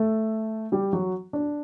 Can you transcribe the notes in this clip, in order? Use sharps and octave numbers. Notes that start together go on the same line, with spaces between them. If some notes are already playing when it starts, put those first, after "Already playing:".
Already playing: A3 A4
G3 G4
F#3 F#4
D4